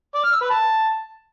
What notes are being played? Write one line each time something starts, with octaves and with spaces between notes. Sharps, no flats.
D5
F6
E6
B4
A5